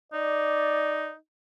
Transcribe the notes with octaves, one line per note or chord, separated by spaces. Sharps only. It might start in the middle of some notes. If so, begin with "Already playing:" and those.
D#4 D5